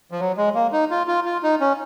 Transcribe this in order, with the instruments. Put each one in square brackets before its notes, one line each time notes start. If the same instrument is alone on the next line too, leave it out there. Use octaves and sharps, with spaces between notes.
[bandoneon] F3
F#3
G#3
A#3
D#4
F4
F4
F4
D#4
C#4